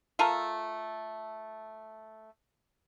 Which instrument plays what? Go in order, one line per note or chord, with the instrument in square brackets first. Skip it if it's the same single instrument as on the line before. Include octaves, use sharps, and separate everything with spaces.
[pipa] A3 F4 A4 A#4